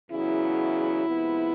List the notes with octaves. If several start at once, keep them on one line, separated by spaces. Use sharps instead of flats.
E2 C#3 F#3 E4
C3 F3 G#3 B3